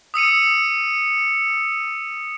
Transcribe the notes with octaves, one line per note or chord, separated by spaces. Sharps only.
D#6 E6 C#7 D#7